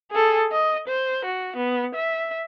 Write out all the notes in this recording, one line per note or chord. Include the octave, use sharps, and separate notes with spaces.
G#4 A4
D#5
C5
F#4
B3
E5